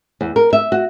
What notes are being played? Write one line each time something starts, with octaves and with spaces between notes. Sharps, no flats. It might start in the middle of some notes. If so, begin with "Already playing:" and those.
E2
A#4
E5
F#4